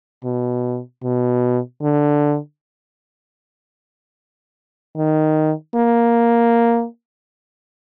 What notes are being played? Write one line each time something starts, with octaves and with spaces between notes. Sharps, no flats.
B2
B2
D3
D#3
A#3